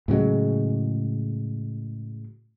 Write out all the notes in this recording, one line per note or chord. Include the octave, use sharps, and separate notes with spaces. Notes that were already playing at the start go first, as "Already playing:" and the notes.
A2 C#3 F#3 G#3